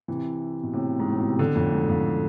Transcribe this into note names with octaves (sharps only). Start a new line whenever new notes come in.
C3 E3
B2
A2 C3
G#2
A2
B2
C3
B2 D3
F2 A2
G#2
F2